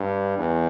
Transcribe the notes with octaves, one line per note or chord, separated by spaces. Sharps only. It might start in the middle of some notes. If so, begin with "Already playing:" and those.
Already playing: G2
E2